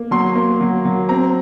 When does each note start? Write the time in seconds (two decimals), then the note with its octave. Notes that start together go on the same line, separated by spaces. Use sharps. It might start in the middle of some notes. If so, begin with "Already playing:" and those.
Already playing: A#3
0.11 F#3 C6
0.35 A#3
0.61 F#3
0.85 F#3
1.09 C4 A#5